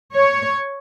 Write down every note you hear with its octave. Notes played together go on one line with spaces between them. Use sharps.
C#5